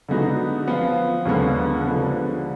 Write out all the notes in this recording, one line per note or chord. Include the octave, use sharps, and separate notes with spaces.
D3 G#3 B3 D#4 F#4
F3 B3 F4
D#2 D3 G#3 B3
D3 F3 G#3 B3